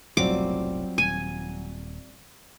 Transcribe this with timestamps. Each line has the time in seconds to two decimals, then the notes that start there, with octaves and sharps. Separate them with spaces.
0.17 F1 B1 A2 F#3 G3 C4 F4 D6
0.98 D#1 G#5